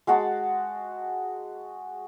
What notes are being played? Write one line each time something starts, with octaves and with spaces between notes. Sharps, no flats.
G#3 F#4 F#5 A5